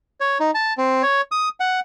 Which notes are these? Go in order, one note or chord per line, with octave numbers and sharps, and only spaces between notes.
C#5
D#4
A5
C4
C#5
D#6
F#5